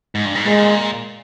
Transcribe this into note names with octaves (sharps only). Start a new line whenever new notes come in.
G#2
G2
G#2
A#2 G#3